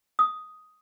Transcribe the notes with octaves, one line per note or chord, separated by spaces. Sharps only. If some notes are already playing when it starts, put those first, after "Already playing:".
D#6